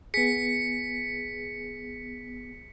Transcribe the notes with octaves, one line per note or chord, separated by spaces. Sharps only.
B3 G#4 B6 C#7